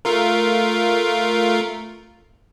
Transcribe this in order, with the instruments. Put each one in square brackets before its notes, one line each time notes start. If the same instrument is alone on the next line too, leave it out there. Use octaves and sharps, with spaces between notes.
[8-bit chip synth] A3 F4 A#4